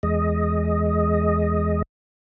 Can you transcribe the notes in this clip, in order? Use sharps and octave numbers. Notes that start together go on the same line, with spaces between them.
E2 G#3 D#5